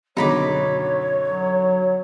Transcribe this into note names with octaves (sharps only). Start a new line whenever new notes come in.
F#2 B2 D3 D#4 C#5 B5 D6
F#3